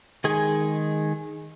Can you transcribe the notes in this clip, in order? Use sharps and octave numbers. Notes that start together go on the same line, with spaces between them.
D#3 G#3 G#4 G#5